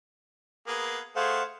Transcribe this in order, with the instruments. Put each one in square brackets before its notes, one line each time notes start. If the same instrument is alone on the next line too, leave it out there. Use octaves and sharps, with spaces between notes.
[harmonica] A#3 B3 G#4
[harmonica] A3 G#4 [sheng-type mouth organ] C5 F5 F#5